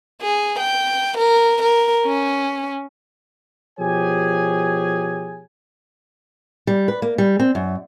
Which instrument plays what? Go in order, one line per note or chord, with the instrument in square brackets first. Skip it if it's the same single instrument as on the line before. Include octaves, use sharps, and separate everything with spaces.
[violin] G#4
G5
A#4
A#4
C#4
[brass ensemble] B2 F3 G4 G#4 C#5 G#5
[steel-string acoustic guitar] G3
B4
A#3
G3
C4
F#2